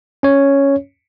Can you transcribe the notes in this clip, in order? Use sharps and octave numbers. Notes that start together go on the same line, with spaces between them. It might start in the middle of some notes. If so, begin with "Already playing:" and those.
C#4 C#5